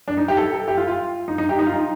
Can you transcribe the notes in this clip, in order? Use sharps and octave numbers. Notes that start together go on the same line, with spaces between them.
D4
D#4
G4
A4
A4
G4
F4
F4
D#4
D#4
G4
D#4
F4
D#4